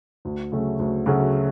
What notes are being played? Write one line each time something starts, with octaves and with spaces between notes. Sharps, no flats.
D2
C#3 F#3 A3 C#4
D2
C#3 F#3 A3 C#4